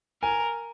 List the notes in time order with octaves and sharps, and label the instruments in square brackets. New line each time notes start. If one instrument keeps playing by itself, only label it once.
[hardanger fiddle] A#4 [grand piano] G#5